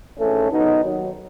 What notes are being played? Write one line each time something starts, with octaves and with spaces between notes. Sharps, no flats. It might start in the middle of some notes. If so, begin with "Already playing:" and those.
G#1 G#2 E3 A3 C#4
C#2 B2 F#3 B3 D#4
D#2 D#3 F#3